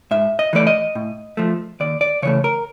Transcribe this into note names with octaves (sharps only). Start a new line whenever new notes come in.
G#2 E5
D#5
E3 A3 D5
D#5
A2
F3 A3
D#2 D5
D5
C#3 E3 A3 C#5
A#4